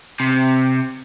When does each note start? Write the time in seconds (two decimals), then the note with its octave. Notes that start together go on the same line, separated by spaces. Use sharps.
0.20 C3